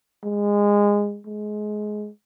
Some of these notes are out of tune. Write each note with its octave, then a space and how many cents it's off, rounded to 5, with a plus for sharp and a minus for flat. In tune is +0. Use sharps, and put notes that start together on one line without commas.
G#3 -20
G#3 +20